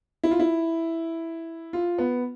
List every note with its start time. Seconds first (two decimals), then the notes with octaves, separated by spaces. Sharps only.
0.23 E4
0.31 F4
0.40 E4
1.73 F4
1.98 B3